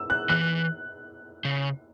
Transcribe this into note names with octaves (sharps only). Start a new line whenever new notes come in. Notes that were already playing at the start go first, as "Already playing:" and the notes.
Already playing: E6
F#6
E3 F#6
C#3